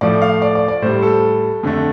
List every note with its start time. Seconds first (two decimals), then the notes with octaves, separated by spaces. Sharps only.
0.01 A2 F3 A3 D5
0.22 F5
0.42 D5
0.55 D5
0.68 D5
0.82 A2 G3 C5
1.02 A4
1.63 F2 D3 A3